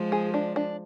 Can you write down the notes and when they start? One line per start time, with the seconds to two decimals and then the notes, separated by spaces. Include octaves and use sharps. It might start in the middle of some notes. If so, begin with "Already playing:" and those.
Already playing: F3 G#3
0.12 G#4
0.34 D4
0.56 D4